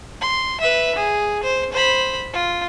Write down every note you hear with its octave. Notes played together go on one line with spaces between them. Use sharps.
C6
B4 E5
G#4
C5
C5 B5
F4